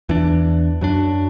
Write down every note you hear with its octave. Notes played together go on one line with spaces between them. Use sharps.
E2 E3 D4
F#2 F#3 D4